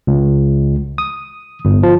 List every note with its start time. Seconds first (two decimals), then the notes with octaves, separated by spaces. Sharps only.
0.07 C#2
0.98 D#6
1.65 G1
1.83 F3